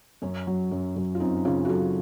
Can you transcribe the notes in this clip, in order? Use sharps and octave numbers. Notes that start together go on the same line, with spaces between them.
F#2 C#4
F#3
F#2
F#2
F4
F#2 C4 D#4
C#3 C#4 F4
F#4
F#3 F4 A4